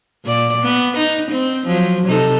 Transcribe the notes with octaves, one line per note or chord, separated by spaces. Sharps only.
A#2 D5
B3
D#4
C4
F3 F#3
C3 D#4 A4